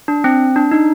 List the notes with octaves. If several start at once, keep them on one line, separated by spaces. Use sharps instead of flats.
D4
C4
D4
D#4